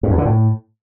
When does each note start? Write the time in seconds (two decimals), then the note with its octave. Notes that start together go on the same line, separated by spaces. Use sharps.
0.03 G2
0.11 E2
0.18 D3
0.25 A2